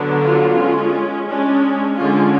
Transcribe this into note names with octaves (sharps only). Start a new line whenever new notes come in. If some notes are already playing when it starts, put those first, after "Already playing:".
Already playing: D3 F#3 B3 D4
F4
G#3 C#4
G#3 C#4 D4
D3 G#3 C#4 F4